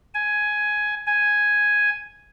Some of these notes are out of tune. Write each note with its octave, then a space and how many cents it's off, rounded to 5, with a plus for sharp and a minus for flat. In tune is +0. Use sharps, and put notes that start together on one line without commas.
G#5 +10
G#5 +0